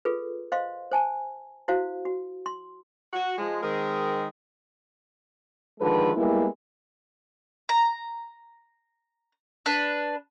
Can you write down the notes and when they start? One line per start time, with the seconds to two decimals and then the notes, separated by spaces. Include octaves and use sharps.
0.05 F4 G#4 A4 B4
0.52 C5 D#5 F5 C6
0.91 C5 G#5 A5
1.68 E4 F#4 C5 F5
2.05 F#4
2.46 C6
3.13 F#4
3.38 F3 G#3
3.63 D#3 G#3 C4 G#4 A#4
5.80 D3 D#3 F3 G#3 A4 B4
6.16 G3 G#3 A#3 B3 E4
7.69 A#5
9.66 D4 B4